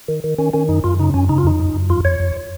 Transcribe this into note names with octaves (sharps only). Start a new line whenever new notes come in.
D#3
D#3
D#3 C#4
D#3 C#4
F#2 D#4
F#2 F4
C#3 D#4
F#2 C#4
C#3 D#4
F4
F2 D#4
F#2
F#2
F2 F4
F2 C#5
F2